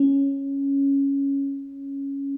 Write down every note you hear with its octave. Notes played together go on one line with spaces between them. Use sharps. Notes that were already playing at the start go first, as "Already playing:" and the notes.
Already playing: C#4